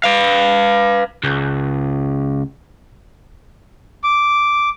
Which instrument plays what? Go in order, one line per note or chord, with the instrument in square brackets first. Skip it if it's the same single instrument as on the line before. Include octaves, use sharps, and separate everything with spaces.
[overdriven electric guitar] B4 F5
C#2
[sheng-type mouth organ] D6